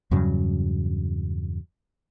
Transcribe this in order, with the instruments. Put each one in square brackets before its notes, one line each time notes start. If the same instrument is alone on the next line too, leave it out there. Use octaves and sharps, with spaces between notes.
[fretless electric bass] E2 G2 C#3 F#3